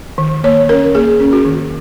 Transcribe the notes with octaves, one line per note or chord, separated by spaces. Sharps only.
D#3
A#3 C#5
C#4 A#4
A#3 G#4
C#4
F#4
D#3